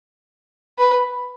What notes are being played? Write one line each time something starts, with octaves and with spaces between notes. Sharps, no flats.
B4